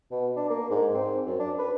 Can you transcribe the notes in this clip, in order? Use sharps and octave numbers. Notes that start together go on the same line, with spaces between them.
B2
D4
A#3
G#2
C4
F#2
D4
B4